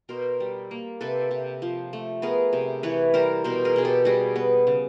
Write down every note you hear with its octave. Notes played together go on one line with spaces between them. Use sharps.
B2 A#4 C5
G3
A#3
C3 A4 B4
C3
F3
A3
B3 G#4 A#4
C3
E3 B4 C#5
G3 A#4 C5
B2 A#4 C5
G#4 A#4
B2 G#4
G4 A4
G3 F#4 G#4
B3
C#3